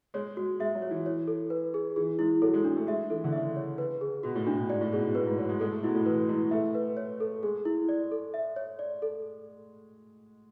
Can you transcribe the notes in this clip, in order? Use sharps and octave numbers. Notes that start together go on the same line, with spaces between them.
G#3 C#5
G#3 F#4
G#3 E5
F#3
C#5
E3
C#5
A4
B4
G#4
E3 G#4
G#3 E4
F#3 A4
G#3
G#3 D4
A3
G#3 E5
E3 A4
D3
C#3 E5
C#5
B4
G#4
B2 F#4
A2
A2 D4
B2
G#2 D5
A2
B2 G#4
B2
A2 B4
G#2
F#3 F#4
G#3
G#3 A4
A3
B2 E4
A2
E3 B4
G#3 E4
A3 E5
B4
C#5
A4
G#3 G#4
E4
D5
A4
E5
C#5
D5
A4